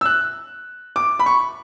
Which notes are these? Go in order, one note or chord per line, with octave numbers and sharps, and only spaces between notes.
E6
F#6
D6
B5
C#6